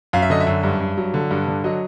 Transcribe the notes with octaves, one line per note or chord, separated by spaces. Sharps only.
F#2 F5
E5
D3 D#5
E5
F#2
G2
G2
F#3
D3
G2
D3
F#3 D#5